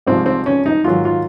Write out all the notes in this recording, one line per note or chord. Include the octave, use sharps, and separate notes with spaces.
C2 C3 F3 G#3 C4
C4
C#4
D#4
G#2 D#3 F#3 F4
F4